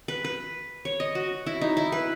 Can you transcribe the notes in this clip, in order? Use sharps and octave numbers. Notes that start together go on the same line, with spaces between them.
B4
B4
C#5
D#5
F#4
E4
D#4
E4
B4